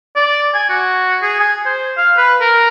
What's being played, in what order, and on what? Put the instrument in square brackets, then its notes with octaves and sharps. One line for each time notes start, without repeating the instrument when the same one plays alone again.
[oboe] D5
G#5
F#4
G#4
G#5
C5
F5
B4
A#4